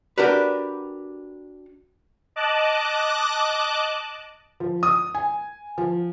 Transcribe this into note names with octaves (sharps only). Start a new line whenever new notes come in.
D4 F#4 G4 A#4 B4
D#5 A5 D6 F#6
F3
D#6
G#5
F3